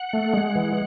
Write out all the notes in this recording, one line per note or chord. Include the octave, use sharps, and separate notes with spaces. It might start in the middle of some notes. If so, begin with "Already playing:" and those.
Already playing: F#5
A3
G#3
E3